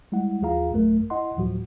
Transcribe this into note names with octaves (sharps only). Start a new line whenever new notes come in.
G3 G#3 E4 F#5
D#2 F3 F4 G#4 F5 A#5
A1 F#2 F#3 A3 A#4
E4 D#5 F#5 C6
D2 A2 F3 F#3 F#4